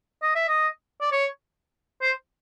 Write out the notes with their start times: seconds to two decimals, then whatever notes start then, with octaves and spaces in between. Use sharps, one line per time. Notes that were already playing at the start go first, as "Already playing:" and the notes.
0.22 D#5
0.35 E5
0.48 D#5
1.01 D5
1.12 C#5
2.02 C5